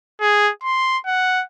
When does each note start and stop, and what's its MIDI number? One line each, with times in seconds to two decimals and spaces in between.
0.21 0.50 68
0.63 0.97 84
1.06 1.43 78